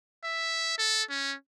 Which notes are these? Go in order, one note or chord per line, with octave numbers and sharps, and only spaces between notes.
E5
A4
C#4